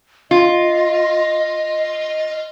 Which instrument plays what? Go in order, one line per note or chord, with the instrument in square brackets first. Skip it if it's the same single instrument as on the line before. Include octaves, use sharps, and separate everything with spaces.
[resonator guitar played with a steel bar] F4 [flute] D#5